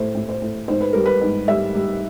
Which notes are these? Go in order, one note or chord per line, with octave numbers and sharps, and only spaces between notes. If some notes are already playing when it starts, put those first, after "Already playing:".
Already playing: A2 C5
A2
C5
A2
G#2 C5
B4
G3 A#4
B4
G#2
G3 E5
G3